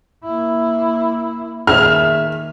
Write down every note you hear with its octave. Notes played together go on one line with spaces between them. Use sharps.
A#3 E4
A#2 D#3 G#4 E5 F6